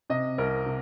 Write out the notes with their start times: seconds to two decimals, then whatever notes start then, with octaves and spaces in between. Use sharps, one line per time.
0.10 C3 D#5
0.38 C2 A#4
0.66 C3